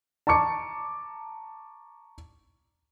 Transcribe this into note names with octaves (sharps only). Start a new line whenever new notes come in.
A5 A#5 C#6 D6 C#7